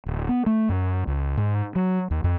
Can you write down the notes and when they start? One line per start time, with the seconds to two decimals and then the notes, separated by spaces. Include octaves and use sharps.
0.06 D1
0.29 B3
0.46 A3
0.69 F#2
1.07 C#2
1.37 G#2
1.75 F#3
2.11 D#2
2.24 F2